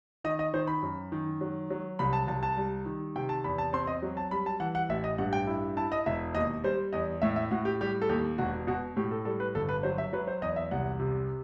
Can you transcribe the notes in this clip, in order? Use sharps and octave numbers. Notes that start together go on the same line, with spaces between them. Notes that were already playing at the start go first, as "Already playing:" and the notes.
D#3 D#5
D#5
D#3 C5
B5
F#2
D#3
F#3
F#3
C2 B5
A5
C2 A5
A5
G3
D#3
C3 G5
A5
E2 B5
A5
C4 C6
D#5
F#3
A5
G3 B5
A5
E3 F#5
F#5
A1 E5
D#5
G2 F#5
G5
E4
E4 A5
D#5
E1 E5
D#2 D#5
G3 C5
E2 D#5
A2 E5
E5
A2 F#4
G4
G3 G4
A4
D#2 G4
E1 F#4
B2 F#4
A2 G4
A4
G3 A4
B4
G1 A4
B4
F#3 C5
E5
F#3 B4
C5
E2 D#5
E5
C2 F#5
C3